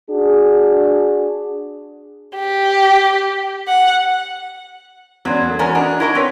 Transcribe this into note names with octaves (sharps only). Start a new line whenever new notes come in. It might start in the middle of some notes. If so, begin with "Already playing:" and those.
D4 F#4 G#4
G4
F#5
E2 F#3 G#3 D4
A3 A#3
E2 C#4 F#4 A#4 C#5 G#5
D4 F#4 D#5 A#5
E4 A#4 D#5 A#5 C#6
C4 B4 C#5 B6